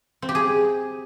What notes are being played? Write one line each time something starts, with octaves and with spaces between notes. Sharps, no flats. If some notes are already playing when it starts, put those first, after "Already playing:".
C4
G4
G#4